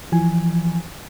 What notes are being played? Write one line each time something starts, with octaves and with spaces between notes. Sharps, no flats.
E3 F3 G#5